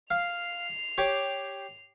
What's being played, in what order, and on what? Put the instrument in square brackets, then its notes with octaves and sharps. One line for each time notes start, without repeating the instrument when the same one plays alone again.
[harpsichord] F5 [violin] C7 F7
[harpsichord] G4 C#5 D6